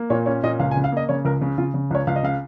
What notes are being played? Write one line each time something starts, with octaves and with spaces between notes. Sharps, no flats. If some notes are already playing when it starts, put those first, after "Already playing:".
Already playing: A#3
A#2 C#5
C#4 C#5
A#2 D#5
C#2 F5
G#5
C#3
F5
A#3 D#5
C#3 C#5
C#2 A#4
C#3
C#3 F4
C#3
C#2 C#5
C#2 F5
D#5
C#3 F5